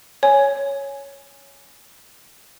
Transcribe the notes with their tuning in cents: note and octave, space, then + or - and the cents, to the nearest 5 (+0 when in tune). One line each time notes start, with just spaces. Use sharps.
C#5 +0 G#5 +0